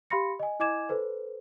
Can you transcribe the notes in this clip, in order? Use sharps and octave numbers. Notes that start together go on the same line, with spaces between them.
G4 F5 B5 C6 A#6 C#7
D#5 G#5
E4 D#5 G#5 D6 G#6 E7
A4 B4 C5